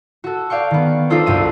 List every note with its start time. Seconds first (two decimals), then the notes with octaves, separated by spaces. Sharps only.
0.24 F#4 A4
0.50 D5 F5 G5 C#6
0.71 D#3 B3
1.10 D4 D#4 F4 A4 C5
1.26 C2 F#2 G4 D#7